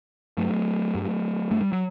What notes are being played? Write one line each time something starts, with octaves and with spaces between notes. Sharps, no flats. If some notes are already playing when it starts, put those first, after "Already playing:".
G2 F#3 A3
G2
G2 A3
G3
F#3